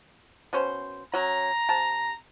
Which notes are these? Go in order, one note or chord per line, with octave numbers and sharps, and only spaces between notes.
B2 C#4 C5
F#3 C#4 A#5
C3 A5